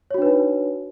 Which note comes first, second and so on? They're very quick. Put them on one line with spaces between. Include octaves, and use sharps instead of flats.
C#5 F#4 D4 B4 D#4